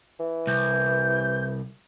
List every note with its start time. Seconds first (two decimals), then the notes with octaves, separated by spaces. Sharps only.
0.19 E3
0.47 C2 G6